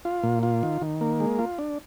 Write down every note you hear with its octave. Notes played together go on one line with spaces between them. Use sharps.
F4
A#2
F4
D#3
D#3
A#3
G#3
F4
D4